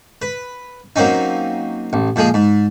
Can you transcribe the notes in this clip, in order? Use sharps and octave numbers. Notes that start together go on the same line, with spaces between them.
B4
F#3 A#3 C4 C#4 D#4
A1
A#2 F3 G#3 G#4
G#2